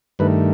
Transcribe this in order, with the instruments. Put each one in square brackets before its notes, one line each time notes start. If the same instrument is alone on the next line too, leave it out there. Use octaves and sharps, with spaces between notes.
[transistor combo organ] G2 D#3 A3 B4